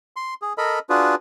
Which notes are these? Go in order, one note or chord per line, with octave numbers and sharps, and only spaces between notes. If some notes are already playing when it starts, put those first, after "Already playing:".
C6
G#4
A4 A#4 D#5 B5
D4 F4 F#4 G#4 B4